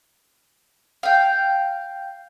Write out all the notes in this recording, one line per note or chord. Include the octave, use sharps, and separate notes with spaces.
F5 G5